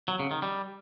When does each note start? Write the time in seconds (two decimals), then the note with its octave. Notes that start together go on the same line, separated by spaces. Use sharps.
0.08 F#3
0.19 C#3
0.31 D#3
0.42 G3